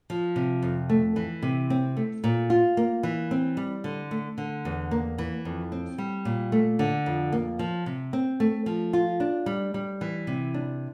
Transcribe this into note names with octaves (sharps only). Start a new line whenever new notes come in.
F3
C3
F2
A3
E3
C3
C4
A3
A#2
F4
A#3
E3
C4
G3
D3
A3
D3
E2
A#3
E3
F2
C4
G3
A#2
A3
D3
F2
A#3
F3
C3
C4
A3
F3
F4
D4
G3
G3
E3
C3
D4